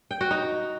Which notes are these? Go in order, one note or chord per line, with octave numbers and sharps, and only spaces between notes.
G5
F#4
D#4